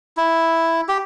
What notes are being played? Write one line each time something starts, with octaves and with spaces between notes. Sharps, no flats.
E4
G4